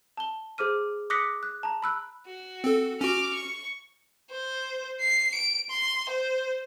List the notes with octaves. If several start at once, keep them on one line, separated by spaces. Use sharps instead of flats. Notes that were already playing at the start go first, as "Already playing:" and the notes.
A5 G7
G#4 C5 D6 F6 D#7
D6 D#6 F#6 A#6 B6 C#7
F#6
A5 A#5
B5 E6 F#6
F#4
C4 A4
C#4 F#4 D6 F6
C#6
C5
C7
D7
C6
C5